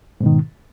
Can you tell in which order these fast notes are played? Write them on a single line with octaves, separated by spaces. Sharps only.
G#2 B2 D#3